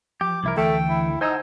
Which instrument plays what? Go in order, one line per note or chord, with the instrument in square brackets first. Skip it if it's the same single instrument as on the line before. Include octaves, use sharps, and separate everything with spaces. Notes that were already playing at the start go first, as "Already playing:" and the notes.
[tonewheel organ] F3 [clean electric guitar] G4 [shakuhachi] D6
[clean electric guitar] C2 E4 A#4
[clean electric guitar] D2 A4 [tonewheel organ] E3 [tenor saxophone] A3 [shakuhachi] G5
[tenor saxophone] E4
[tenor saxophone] D#4 [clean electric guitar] C5 G#5 [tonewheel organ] F#5 A5 E6